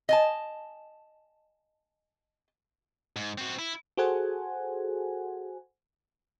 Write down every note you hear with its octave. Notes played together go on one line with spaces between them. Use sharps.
D#5 G#5 A5
G#2
C4 F#4
E4
F#4 G#4 A4 C5 F#5 G#5